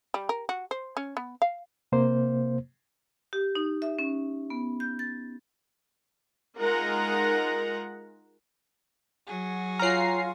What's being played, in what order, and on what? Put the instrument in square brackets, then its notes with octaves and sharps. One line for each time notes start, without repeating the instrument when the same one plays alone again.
[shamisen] G3
A#4
F#4
C5
C#4
B3
F5
[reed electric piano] C3 A#3 C5
[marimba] G4
D#4
E5
C#4
B3
G6
A6
[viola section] G#3 D#4 F4 A#4 F#5 A#5
[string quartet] F#3 F#4 G#4
[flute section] F4 G#5 [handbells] C#5 F6 [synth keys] A#5 C7